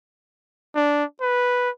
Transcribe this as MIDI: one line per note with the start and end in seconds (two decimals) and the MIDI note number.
0.75 1.04 62
1.21 1.70 71